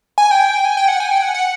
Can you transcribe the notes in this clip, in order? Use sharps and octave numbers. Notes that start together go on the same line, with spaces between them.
G#5
G5
G#5
G5
F#5
G#5
G5
F#5
F#5